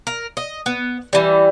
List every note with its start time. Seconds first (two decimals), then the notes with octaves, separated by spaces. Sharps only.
0.07 A#4
0.37 D#5
0.66 B3
1.13 E3 G3